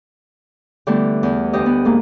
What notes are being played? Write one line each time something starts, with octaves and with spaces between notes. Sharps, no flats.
D3 E3 G3 A3 B3
E2
D2 G4 D#5
B3
G#2 A#3